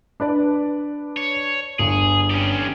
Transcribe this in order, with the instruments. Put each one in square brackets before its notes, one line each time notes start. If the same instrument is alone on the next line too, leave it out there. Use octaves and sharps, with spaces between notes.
[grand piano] D4 B4 D5
[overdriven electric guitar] C#5
[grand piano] G1 [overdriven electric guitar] G#4
[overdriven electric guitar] C#4 G4